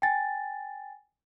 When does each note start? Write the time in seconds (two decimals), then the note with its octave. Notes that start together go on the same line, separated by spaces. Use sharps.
0.02 G5 G#5 A6